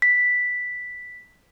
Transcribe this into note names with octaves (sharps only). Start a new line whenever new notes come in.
B6